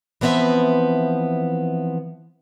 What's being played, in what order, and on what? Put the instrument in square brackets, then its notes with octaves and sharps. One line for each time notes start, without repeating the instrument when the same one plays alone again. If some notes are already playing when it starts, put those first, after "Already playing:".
[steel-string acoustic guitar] E3 F3 B3 C4 E5